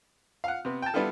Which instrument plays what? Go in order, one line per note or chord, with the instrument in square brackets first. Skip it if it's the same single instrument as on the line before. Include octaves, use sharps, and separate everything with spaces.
[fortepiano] F5 F#5
C3 B3
G5 A5
G3 B3 D4 E4 F4 A4